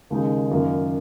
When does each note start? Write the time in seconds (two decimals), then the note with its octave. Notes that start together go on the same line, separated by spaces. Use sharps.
0.10 D#2 C#3 G#3 D#4
0.51 F#2 D#3 A#3 F4 A#4